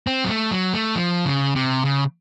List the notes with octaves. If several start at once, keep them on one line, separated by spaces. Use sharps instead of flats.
C4
F#3
A3
F#3
A3
F3
C#3
C3
C#3